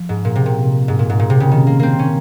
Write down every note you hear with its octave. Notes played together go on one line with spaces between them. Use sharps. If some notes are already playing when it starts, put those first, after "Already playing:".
Already playing: F3
G#2
A#2
C3
A#2
G#2
A#2
G#2
A#2
C3
C#3
D#3
A#3
A#3 C4
C#4